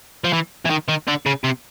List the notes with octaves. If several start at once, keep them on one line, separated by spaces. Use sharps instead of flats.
F3
E3
E3
D#3
D#3
D3
C#3
C3